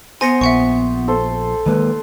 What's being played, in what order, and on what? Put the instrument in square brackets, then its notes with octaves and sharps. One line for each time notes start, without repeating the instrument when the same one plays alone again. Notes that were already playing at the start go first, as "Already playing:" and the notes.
[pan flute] B3 [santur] C5 [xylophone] G#5 A#6 C#7
[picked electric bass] A#1 [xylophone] E5 F#5 C#6
[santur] A4 C5
[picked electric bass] D#3 G#3 A#3 [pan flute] B4